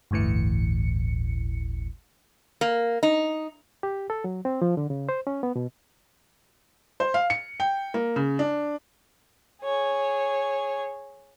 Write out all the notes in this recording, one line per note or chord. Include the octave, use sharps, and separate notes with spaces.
G1 D2 A2 E3 C#7
A#3
D#4
G4
A4
F#3
C4
F3
D3
C#3
C5
C#4
B3
B2
C5
F5
C#7
G5
A#3
C#3
D4
G#4 C#5